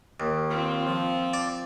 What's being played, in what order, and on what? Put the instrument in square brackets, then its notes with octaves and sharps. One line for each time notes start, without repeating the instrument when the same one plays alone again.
[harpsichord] D#2
[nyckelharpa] C4 [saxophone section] F4
[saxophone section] F3
[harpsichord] D5